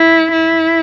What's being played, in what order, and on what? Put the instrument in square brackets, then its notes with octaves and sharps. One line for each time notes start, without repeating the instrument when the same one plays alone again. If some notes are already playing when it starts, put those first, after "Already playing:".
Already playing: [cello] E4
E4